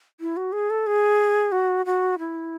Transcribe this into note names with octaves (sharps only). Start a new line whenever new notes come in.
E4
F#4
G#4
A4
G#4
F#4
F#4
E4